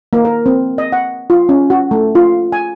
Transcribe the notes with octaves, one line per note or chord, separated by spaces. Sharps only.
A#3
A#4
C4
D#5
F#5
F4
C#4
F#4
A3
F4
G#5